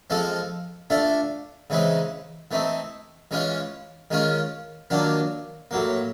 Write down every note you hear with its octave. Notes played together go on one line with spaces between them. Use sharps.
F3 G#3 C4 F4 A4
A3 D4 F4 A4
C#3 E3 G#3 C4 D#4
E3 A3 C4 D#4
E3 G#3 C#4 F4
D#3 G#3 C#4 F4
D#3 F#3 A#3 D4 F4
A2 F#3 A#3